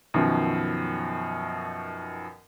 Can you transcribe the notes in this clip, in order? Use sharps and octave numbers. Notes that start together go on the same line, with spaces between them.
F#2 B2 D#3 F3